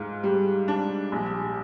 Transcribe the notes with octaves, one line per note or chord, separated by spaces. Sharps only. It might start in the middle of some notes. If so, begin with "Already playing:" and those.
Already playing: G#2 F4
G3
D4
A#1